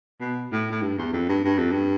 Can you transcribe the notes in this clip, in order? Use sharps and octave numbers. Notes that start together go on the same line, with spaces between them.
B2
A2
A2
G2
E2
F2
G2
G2
F2
G2